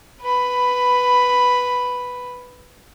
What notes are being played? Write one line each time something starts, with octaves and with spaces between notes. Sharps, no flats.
B4 B5